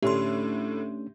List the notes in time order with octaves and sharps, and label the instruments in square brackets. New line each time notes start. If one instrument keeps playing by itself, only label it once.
[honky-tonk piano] A2 D3 [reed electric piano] A3 C#4 D4 [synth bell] G4 C6